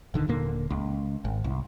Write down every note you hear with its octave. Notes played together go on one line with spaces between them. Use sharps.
D#1 D3 D#3
D#1 A#2 D3 A#3
C#2
G#1
C2